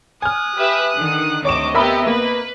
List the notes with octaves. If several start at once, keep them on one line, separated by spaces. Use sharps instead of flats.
G#5 D#6 F6 F#6
G4 B4 E5
D3 D#3
D2 C3 C#5 D#5 C#6 D6 E7
B3 G4 A#4 E5 B5
A#3 B4